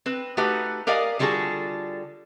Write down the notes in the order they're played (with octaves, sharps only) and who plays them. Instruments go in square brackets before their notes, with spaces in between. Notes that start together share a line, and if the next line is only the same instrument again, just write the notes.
[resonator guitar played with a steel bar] C4 B4
A3 D#4 F#4 G4 B4
G4 A#4 D5 D#5 F5 G#5
D3 G3 F4 F#4 G#4 A4